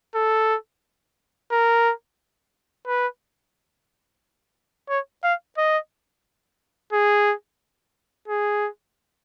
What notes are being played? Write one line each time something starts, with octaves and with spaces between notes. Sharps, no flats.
A4
A#4
B4
C#5
F5
D#5
G#4
G#4